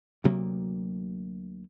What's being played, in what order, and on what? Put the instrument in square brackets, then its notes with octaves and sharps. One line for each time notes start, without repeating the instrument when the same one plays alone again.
[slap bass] D2 C3 F#3 A#3